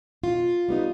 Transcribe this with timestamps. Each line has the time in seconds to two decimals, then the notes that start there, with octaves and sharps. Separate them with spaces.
0.23 B2 F4
0.69 G3 B3 D#4